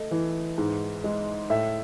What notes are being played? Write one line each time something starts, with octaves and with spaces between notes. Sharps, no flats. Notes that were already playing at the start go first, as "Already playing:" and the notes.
Already playing: A3 D#5
E3
G#2
G#3
A2 E5